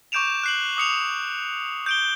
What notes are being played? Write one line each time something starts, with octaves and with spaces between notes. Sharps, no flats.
C#6 D6 G6 D7 E7 F7
F#6 C7 F#7
D6 D#6 C#7 F7
G6 D7 G7